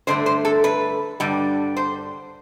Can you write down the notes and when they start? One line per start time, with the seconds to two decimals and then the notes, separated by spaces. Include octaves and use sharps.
0.07 G2 D3 A3 C5
0.26 C5
0.45 A4
0.64 B4
1.20 G2 D3 G3
1.77 C5